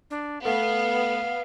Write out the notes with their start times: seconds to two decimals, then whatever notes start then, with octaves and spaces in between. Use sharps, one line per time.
0.10 D4
0.45 A3 B3 F5